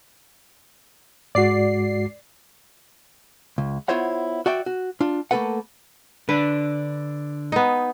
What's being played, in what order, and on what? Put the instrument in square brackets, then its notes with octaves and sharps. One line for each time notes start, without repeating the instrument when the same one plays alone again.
[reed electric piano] G#2 G#3 F#4 [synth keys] D5 C7
[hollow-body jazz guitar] C#2
B3 E4 F4 C5 C#5 F#5
F#4 D5 E5 G5
F#4
D4 F4
A3 A#3 E4 A4 B4 F#5
[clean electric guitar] D3 D4 [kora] B4
[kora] B3 D#4